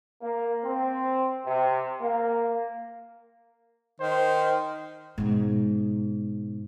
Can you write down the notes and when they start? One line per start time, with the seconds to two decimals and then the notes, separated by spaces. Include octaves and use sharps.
0.22 A#3
0.63 C4
1.46 C3
2.00 A#3
4.00 D#3 C5
5.18 G#2 B2